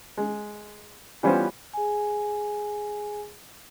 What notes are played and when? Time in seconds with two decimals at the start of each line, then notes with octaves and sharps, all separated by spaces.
0.17 G#3
1.23 E3 G3 B3 C#4 F4 C5
1.74 G#4 G#5